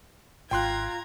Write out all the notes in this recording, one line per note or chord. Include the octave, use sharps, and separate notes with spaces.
G#1 F4 G5 A#5 C6 F#6 G#6